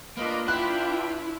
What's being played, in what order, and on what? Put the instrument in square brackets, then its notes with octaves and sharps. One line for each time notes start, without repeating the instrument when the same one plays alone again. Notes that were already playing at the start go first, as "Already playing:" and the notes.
[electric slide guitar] A#3 [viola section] D4 F4 [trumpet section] B4 D#5
[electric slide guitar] E4 [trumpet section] B4 G5 [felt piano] F#6